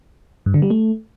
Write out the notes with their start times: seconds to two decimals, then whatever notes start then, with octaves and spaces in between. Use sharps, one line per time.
0.46 G2
0.54 D3
0.62 G3
0.70 A3